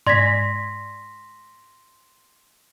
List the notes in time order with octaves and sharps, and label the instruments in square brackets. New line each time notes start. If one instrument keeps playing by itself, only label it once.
[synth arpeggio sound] G#2 D5 G#6 [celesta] C6 A#6 B6